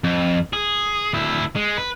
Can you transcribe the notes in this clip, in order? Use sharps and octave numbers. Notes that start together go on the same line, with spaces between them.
F2
G#4
D2 E4
G#3
B4